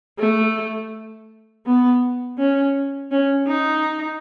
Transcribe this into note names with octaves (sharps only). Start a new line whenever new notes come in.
A3
B3
C#4
C#4
D#4